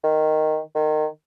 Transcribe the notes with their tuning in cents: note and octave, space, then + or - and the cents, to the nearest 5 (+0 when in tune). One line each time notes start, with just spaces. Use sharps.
D#3 -5
D#3 -20